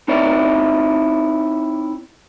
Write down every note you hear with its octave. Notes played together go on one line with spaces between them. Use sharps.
C4 D#4 E4 C#5 D5